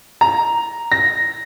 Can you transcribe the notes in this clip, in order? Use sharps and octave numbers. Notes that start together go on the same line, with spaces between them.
A#5
A#6